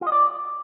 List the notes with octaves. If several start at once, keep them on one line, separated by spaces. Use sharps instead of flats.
F4
D#5
D5